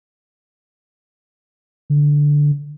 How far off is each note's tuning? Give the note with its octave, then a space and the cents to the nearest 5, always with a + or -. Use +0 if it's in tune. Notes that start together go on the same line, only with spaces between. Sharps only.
D3 -5